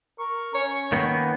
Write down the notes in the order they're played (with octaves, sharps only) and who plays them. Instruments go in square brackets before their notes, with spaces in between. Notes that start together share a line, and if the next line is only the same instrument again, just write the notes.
[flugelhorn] A#4 [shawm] C#6
[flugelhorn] C#4 [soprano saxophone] C#5
[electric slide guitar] D#3 A#3 B3 [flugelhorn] C#4